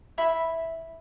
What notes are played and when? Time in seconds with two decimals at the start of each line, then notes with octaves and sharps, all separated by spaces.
0.18 E4 E5 B5